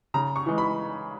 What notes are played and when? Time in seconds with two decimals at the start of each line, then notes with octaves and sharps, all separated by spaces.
0.14 C#3 A#5
0.36 C#6
0.46 E3 G#3
0.58 B5